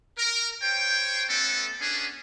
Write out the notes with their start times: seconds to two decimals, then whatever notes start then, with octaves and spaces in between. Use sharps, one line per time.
0.18 A#4
0.62 C5 C#5 G5
1.30 A3 B3 C#4 A4
1.81 B3 C#4 D4 G#4